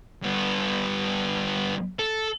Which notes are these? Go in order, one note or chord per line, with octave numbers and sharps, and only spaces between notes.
G2 B3
A4